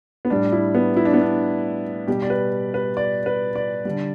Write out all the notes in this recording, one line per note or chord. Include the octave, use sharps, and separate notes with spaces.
B3
A2 G3 D4
E4
B3
E4
D4
B3
D4
B2 G3 G4
D5
B4
B4
D5
B4
D5
D3 G3